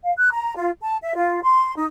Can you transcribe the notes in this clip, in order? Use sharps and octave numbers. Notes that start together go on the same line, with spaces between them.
F5
F#6
A#5
F4
A5
E5
F4
C6
D#4